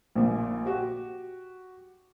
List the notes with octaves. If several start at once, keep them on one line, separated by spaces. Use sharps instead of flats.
A#1 A#2
F#4 G4